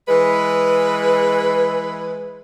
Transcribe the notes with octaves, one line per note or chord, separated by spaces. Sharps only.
E3 G#3 B4